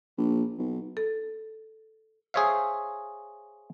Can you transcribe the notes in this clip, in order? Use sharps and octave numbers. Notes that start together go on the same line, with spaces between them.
A#1
B1
A4
G#4 C5 C#5 E5 F5